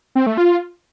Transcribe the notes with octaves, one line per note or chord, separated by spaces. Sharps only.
C4
A3
F4